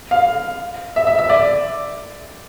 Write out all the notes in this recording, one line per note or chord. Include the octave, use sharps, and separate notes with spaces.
F5
E5
E5
E5
D5